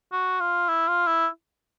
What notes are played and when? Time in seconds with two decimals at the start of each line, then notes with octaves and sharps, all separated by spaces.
0.12 F#4
0.40 F4
0.68 E4
0.88 F4
1.07 E4